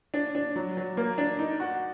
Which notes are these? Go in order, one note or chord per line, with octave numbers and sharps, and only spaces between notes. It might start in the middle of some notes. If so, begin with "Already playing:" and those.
D4
D4
F#3
F#3
A#3
D4
D#4
F#4